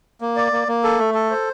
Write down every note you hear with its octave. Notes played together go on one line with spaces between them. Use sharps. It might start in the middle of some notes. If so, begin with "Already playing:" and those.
A#3
D5
A#3
A#3
A4
A3
A4
C5